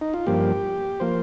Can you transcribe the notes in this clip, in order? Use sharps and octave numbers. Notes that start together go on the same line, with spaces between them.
D#4
F4
G2 F3 A#3 G4
F3 A#3 C5